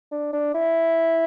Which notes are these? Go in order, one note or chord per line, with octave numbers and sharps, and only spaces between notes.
D4
D4
E4